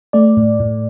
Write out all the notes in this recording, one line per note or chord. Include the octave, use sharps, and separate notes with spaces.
A3 D5
A2
A2